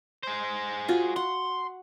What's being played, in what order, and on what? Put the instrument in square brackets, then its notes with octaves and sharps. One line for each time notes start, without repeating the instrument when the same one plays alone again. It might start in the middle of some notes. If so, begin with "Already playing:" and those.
[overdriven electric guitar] G#4 C5
[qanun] F4 F#4
[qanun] F#5 [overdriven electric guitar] C6